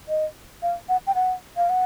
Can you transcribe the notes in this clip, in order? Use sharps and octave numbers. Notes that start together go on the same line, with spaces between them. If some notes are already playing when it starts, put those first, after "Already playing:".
D#5
F5
F#5
G5
F#5
F5
F#5